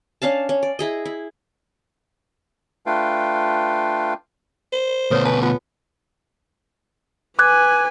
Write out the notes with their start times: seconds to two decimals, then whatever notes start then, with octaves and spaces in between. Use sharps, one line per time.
0.22 C#4 D4 F5 A5
0.49 C#4
0.63 D5
0.79 E4 G#4 D#5
1.05 E4
2.86 A3 D4 F4 B4 F5 G5
4.73 C5
5.11 D2 B2 A4 B4 C#5
5.25 B4 G#5 A5
5.43 B3 F4
7.39 B4 G#5 D6 F#6 G#6